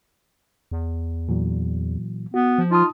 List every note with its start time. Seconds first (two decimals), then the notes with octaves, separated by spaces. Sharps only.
0.72 E2
1.29 A#2 E3 F#3
2.34 B3 F#4
2.58 F3
2.71 D#4 F4 A5 D#6